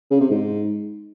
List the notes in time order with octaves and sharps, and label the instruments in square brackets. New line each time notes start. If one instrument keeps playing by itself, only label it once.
[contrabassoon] C#3
C3
G#2